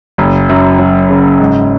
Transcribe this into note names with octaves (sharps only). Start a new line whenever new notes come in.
F#1
F#2
F#3
C#3
G#2